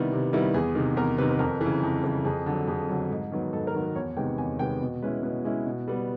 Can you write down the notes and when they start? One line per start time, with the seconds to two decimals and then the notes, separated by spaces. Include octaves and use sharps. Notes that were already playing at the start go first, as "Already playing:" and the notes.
Already playing: C3 D#3 G3 B3 E4
0.12 C3
0.33 D#3 G3 B3 E4
0.54 E2 G#4
0.75 C3 D#3
0.96 E2 A#4
1.18 C3 D#3 B4
1.31 B4
1.39 F2 A#4
1.61 E3
1.66 C#3
1.83 F2
2.04 C#3 E3
2.25 F2 G#4
2.46 D3 F#3
2.68 F2 G#4
2.89 D3 F#3
3.11 G#2
3.32 D#3 F#3 B3
3.52 G#2 A4
3.67 A#4
3.75 D#3 F#3 B3
3.81 B4
3.95 E2 C#5
4.16 C3 D#3 G#3 B3 G5
4.38 E2 G#5
4.59 C3 D#3 G#3 B3 G5
4.81 B2
5.02 G#3 C#4 E4 B4
5.23 B2 B4
5.44 G#3 C#4 E4
5.67 B2
5.88 G3 B3